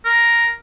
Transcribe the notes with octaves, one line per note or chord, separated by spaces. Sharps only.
A#4